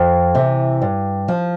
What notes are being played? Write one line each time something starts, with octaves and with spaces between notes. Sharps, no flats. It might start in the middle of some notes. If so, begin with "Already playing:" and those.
Already playing: F2
C3 E3
G2
F3